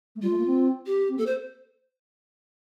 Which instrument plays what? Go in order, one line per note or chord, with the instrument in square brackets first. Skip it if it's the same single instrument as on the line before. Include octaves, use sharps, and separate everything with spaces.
[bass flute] A3
[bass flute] G3 [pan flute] F4
[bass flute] A3
A#3
C4
[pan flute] G4
[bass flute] C4
[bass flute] A#3 [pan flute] A4
[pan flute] C5